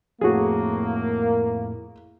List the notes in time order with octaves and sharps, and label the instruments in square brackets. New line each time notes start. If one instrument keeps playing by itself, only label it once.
[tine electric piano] F2 A2 [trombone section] A#3 [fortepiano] F#4 G#4